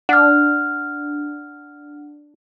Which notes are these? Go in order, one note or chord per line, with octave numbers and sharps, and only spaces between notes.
D4 F#5 F6